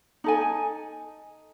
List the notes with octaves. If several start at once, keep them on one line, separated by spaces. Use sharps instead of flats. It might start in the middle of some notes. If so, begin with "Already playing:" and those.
D#4 A4 G#5